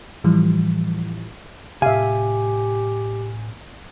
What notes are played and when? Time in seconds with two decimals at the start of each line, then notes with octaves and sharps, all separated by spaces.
0.24 A2 E3 F3 G3
1.82 A2 C3 G4 E5 F5 G#5